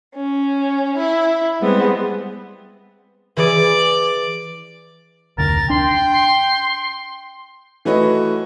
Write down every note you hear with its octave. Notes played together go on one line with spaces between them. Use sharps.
C#4
E4
G3 G#3 B3 C4
E3 G#4 D5 D#7
F1 D2 A#4 A6
D4 G5 C6
C6
E3 A3 F#4 B4 C#5 D#5